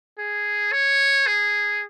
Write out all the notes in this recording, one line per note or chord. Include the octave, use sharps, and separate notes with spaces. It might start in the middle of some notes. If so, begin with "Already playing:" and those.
G#4
C#5
G#4